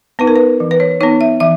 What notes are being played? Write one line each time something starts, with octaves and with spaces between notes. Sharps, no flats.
B3 D#4 B4
A#4
B4
E3
B4
C#5
B3 D#4 C#5
E5
E3 E5